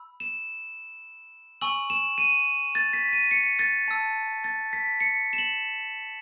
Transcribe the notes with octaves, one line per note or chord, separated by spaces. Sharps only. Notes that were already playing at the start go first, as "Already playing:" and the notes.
Already playing: B5 E6
E7
G#5 C#6 E6 F#7
E7
D#7
A6
B6
D#7
C#7
A6
A5 E6
A6
B6
C#7
E7
F#7